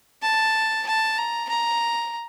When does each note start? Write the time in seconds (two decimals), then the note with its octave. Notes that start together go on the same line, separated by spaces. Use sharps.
0.22 A5
0.87 A5
1.18 A#5
1.49 A#5